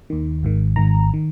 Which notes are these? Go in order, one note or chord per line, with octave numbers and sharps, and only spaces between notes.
D#2 D#3
G#1 G#2 D#3
G#1 G#2 D#3 A#5
D#3